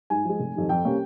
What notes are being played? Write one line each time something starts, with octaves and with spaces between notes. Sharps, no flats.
G#2 G#5
F3 G#3
F1
F2 D#3 G3
F2 G5
C3 G3 A#3 C#4